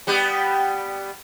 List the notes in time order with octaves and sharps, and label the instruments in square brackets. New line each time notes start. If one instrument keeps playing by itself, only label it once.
[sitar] G3 B3 G4